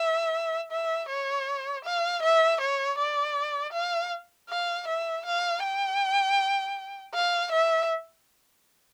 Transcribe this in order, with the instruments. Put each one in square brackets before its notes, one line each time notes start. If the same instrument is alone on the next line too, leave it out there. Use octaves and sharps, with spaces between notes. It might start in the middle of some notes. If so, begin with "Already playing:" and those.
Already playing: [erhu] E5
E5
C#5
F5
E5
C#5
D5
F5
F5
E5
F5
G5
F5
E5